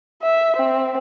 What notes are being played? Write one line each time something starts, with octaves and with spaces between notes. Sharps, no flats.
E5
C4